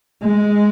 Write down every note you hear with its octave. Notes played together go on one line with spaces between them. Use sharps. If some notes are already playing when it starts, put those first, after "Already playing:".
G#3